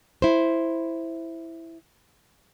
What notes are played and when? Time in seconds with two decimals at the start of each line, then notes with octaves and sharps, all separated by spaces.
0.22 E4 C5